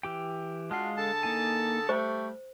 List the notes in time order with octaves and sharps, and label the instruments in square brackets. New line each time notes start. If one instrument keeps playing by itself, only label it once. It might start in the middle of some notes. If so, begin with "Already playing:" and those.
[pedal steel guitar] E3 G4 G5
[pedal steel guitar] G#3 F5 [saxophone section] D4 F4 F#4
[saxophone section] D3 G#4 A4 [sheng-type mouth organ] A5
[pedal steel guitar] A#3 D#4 G#5
[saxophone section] G3 A3 [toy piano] C5 [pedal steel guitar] C#6